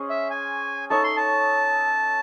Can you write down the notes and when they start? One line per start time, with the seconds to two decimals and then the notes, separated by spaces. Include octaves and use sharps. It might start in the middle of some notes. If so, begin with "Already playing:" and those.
Already playing: C#4 G#4 C5 D#5
0.10 E5
0.30 G#5
0.90 D#4 A4 C#5 E5 A5
1.04 C6
1.17 A5